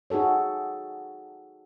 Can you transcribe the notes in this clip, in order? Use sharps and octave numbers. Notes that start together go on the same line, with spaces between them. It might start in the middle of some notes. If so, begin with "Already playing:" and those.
D#4 F#4 G#4 A4 C#5